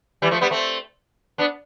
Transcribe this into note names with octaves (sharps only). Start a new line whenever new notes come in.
E3 G3
F3 A3
G3 B3
A3 C4
B3 D4